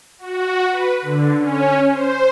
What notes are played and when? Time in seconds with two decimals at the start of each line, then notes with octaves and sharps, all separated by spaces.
0.19 F#4
0.69 B4
1.02 D3
1.38 C#4
1.89 C5